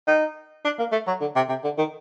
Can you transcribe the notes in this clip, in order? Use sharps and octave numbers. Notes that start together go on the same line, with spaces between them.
D#4
D4
A#3
A3
F#3
D3
C3
C3
D3
D#3